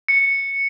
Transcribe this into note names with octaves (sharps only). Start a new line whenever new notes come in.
C#7